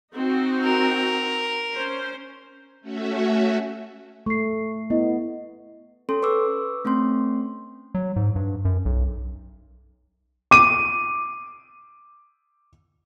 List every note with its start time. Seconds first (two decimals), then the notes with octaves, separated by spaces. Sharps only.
0.14 C4 D#4 F#4
0.64 A#4
1.74 C#4 C5
2.81 A3 C#4 F#4 E5
4.26 A3 C#6 C7
4.90 B3 E4 D#5
6.09 C#4 A4 C6
6.22 B4 C#6 D6 E6
6.85 A3 C4 C#4 C6
7.95 F#3
8.16 G#2
8.36 G2
8.65 F#2
8.85 B1
10.51 D6 D#7